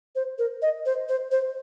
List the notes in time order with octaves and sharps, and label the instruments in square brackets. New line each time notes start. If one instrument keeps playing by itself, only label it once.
[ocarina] C5
A#4
D#5
C5
C5
C5